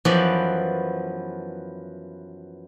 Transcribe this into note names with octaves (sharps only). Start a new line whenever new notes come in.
F#2 E3 F3 B3 D5 G5